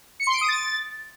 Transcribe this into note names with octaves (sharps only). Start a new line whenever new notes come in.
C#7
C6
D7
D#6
A6